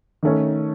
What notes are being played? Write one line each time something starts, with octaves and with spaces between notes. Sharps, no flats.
D#3 A3 C#4